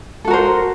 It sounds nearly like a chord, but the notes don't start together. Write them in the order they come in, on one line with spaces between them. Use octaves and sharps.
A4 F#4 A#4 C5